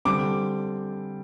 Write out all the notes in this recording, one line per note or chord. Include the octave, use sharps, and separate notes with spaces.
D3 G3 C4 D6